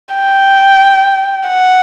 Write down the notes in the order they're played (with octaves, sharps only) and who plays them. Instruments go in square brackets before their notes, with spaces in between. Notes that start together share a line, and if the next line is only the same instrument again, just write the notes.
[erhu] G5
F#5